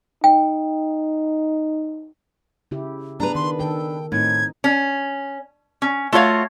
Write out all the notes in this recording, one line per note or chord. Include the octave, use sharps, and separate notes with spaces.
D#4 G5
C#3 E4 G4
B3 D4 G#4 B4 A#5
D#3 C6
D#3 A4 G5
A2 C4 D#4 G#6
C#4
C#4
A3 F4 F#4 C#5 F5